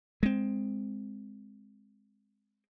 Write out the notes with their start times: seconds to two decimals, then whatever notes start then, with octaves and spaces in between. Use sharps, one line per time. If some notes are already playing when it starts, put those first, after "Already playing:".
0.23 G#3 C4